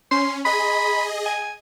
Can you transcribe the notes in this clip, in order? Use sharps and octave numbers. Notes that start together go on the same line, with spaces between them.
C#4 C6
G#4 D#5 B5
G#5